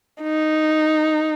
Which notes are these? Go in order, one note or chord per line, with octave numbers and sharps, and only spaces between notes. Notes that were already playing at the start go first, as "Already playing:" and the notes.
D#4